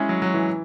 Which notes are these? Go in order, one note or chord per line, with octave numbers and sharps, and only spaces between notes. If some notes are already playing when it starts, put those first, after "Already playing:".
Already playing: G#3 C#4 E4 G#4
F#3
F#3
E3